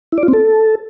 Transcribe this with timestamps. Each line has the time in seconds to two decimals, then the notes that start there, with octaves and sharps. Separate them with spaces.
0.12 E4
0.18 D5
0.23 F4
0.28 C4
0.33 A4